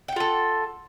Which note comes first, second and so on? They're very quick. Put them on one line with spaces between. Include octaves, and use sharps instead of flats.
G5 F#5 F4 A4